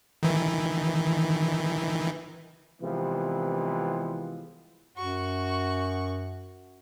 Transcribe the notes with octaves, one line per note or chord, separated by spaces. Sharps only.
D#3 E3
C2 C3 E3 F3 G#3 B3
F#2 F#4 C#6